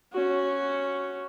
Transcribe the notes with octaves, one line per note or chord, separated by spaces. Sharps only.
C#4 F#4